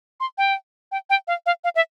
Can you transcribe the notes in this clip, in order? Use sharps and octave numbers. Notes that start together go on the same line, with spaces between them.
C6
G5
G5
G5
F5
F5
F5
E5